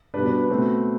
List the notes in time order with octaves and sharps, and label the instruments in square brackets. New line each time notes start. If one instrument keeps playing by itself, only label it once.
[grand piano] B2 G3 D4 B4
B4
B4
B2 A3 C4